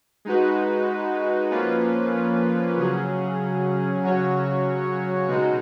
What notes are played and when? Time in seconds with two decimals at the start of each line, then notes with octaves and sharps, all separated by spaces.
0.25 G#3 D#4 F#4 B4
1.50 F3 A#3 C#4 F4 B4
2.76 C#3 F#3 C#4 G#4
4.02 C#3 F#3 C#4 F#4 C#5
5.28 B2 G#3 D#4 F#4